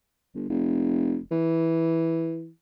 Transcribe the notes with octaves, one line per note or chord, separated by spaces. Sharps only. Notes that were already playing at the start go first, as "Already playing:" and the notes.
G1
F1
E3